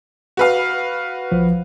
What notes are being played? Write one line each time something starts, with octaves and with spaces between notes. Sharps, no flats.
F#4 B4 F5
B1 F3